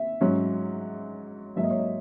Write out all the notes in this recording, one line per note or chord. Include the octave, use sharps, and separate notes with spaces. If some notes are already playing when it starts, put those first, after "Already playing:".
Already playing: E5
G#2 F#3 C#4
G#2 F#3 A#3 E5
D#5
C#5
D#5